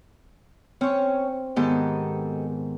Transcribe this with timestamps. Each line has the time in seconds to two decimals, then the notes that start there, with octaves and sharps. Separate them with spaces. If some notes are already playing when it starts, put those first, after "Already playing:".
0.81 C4 C#4 C#5
1.56 G#2 D#3 B3 G4 A4 D#5